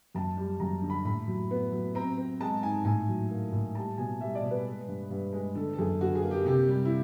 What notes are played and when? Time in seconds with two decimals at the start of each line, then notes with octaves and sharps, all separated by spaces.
0.15 F#2 A5
0.37 G3
0.60 F#2 A#5
0.82 D3
0.90 B5
1.05 A2 B5
1.28 F#3
1.51 B3
1.72 F#3
1.95 C4 A#5
2.18 C4
2.40 G#3 A5
2.62 G#2 G#5
2.85 A2 G#5
3.09 F#3
3.31 A#3
3.52 A2
3.75 G3 A5
3.98 B2 G#5
4.20 G3 E5
4.35 D5
4.43 B2
4.51 B4
4.65 G#3
4.88 G2
5.10 G2
5.33 G#3
5.55 D3 A4
5.73 A4
5.78 F#2 G#4
6.00 D3 F#4
6.15 G#4
6.23 A#3
6.31 G4
6.46 C3 G4
6.68 G3
6.85 E4